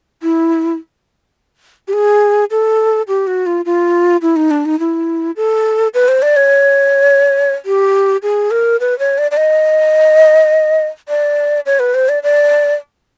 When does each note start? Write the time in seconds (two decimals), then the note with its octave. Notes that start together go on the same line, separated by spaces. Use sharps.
0.22 E4
1.88 G4
1.93 G#4
2.51 A4
3.08 G4
3.27 F#4
3.46 F4
3.65 F4
4.22 E4
4.36 D#4
4.51 D4
4.65 D#4
4.79 E4
5.36 A4
5.94 B4
6.08 C5
6.22 D5
6.36 C#5
7.65 G4
8.23 G#4
8.51 A#4
8.80 B4
8.99 C#5
9.18 D5
9.31 D5
9.37 D#5
11.09 D5
11.66 C#5
11.79 B4
11.94 C5
12.09 D5
12.23 D5